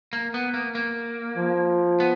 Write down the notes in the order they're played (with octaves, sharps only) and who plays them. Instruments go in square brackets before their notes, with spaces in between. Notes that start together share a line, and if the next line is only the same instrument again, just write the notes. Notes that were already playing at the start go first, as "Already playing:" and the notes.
[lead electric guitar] A#3
B3
A#3
A#3
[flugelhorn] F3
[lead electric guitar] B3